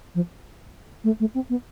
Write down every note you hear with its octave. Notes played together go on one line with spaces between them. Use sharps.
F3
A3
A3
C4
B3